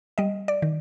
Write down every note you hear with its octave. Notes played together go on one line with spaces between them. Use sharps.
G3 D#5
D5
D#3